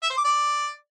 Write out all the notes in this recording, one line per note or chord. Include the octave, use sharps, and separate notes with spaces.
E5
C5
D6
D5